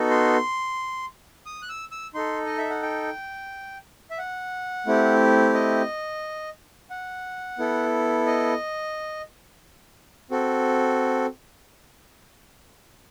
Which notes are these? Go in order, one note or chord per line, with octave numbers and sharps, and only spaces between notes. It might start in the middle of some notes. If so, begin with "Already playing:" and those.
Already playing: B3 D#4 F#4 A4
C6
D#6
F#6
E6
E6
D#4 A4 C6
D#5
E5
F#5
G5
E5
F#5
A3 C4 E4 G4
D#5
F#5
B3 E4 A4
D#5
C4 F#4 A4